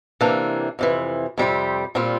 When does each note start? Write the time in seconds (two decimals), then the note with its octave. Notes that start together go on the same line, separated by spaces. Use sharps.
0.21 C3 E3 A#3 D4
0.79 F2 C3 E3
1.38 F2 C3 G3 C4 G4
1.95 A#2 G3 C4 F4